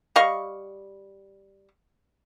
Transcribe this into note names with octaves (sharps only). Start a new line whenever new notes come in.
G3 D#5 F5 C#6